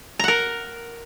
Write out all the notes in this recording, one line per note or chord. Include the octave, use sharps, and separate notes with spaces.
A#4 F#5 A#5